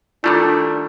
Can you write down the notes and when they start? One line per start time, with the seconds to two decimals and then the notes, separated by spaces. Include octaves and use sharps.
0.24 D#3 G3 A3 D4 E4 F4 A4